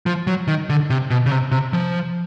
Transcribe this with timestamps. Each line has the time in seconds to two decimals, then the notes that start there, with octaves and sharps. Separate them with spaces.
0.06 F3
0.27 F#3
0.48 D#3
0.70 D3
0.90 C3
1.10 B2
1.26 C#3
1.31 C3
1.51 C3
1.73 F3